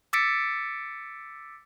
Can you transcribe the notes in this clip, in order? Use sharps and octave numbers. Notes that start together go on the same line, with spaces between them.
D6 E6 A6 B6 C#7 D7